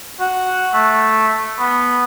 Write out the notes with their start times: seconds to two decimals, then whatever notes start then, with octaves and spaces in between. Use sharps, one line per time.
0.20 F#4
0.73 A3
1.59 B3